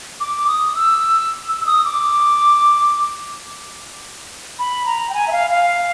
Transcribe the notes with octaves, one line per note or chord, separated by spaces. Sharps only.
D6
D#6
E6
E6
E6
D#6
D6
B5
A#5
G5
G#5
E5
F5
F5